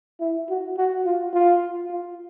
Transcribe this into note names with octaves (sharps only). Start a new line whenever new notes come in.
E4
F#4
F#4
F4
F4
F4